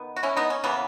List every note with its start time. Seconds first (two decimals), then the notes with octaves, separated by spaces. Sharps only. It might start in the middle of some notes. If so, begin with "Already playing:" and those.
Already playing: D#3 B3
0.16 F#4
0.23 C#4 E4
0.36 B3 D#4
0.50 C#4
0.64 C#3 E3 A#3 B3